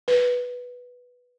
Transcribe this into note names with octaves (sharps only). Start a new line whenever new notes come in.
B4